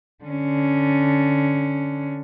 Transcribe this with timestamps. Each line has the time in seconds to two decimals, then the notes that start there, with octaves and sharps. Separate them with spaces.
0.24 D3 C#4